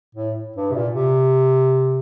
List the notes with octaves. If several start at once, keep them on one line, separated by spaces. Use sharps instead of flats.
A2
G2
C3
A#2
C3